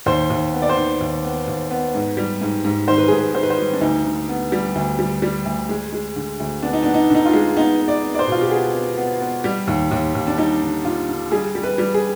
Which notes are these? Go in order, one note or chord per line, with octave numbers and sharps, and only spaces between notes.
D#2 C5
D#2
B3
D5
C5
D#3
D#2
B3
D#2
B3
G#2
G3
G#2
G#2
D#3 C5
B4
G#2 G#4
B4
D#3 C5
B4
C5
G3
D4
D2 D#4
D3
B3
G3
D2
G3
G3
D2
G#3
G#3
D3
D2
B3 D4
D#4
D4
B3
D#4
D3 D#4
F4
G#3
B3 D#4
B3
D5
B3
D5
C5
B2 F4
G4
B3 G#4
B3
B3
B3
G3
D#2
D#2
D#2
D4
G3 D#4
D3
D3 F4
D3
G3 G#4
G3
B4
G3
G#4